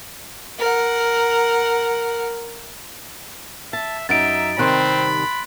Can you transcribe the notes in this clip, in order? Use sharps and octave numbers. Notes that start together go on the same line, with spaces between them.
A#4 F#5
E5 A5
F#2 D#4 E5 A#5 A6 D7
C3 D#3 G3 C4 B5 C6 F#6 D7